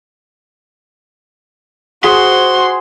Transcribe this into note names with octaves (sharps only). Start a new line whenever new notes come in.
F#4 G#4 C5 C6